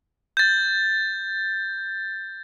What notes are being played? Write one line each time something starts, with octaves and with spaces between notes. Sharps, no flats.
G6 A6